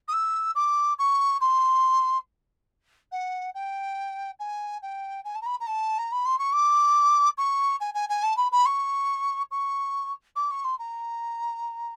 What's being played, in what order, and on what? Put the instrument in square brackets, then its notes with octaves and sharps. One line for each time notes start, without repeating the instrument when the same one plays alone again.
[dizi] D#6
E6
D6
C#6
C6
F#5
G5
G#5
G5
G#5
A5
A#5
B5
A#5
A5
A#5
B5
C6
C#6
D6
C#6
G#5
G#5
G#5
A5
B5
B5
C#6
C#6
D6
C#6
C6
A#5